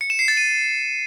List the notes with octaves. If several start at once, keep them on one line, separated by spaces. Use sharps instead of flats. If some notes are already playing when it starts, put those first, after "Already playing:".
C#7
E7
C7
A6
D#7